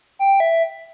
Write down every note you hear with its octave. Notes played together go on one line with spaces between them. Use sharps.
G5
E5